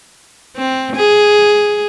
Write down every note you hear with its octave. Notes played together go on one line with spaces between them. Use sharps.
C4
G#4